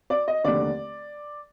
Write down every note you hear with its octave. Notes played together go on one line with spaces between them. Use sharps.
D5
D#5
F1 D#2 D3 D5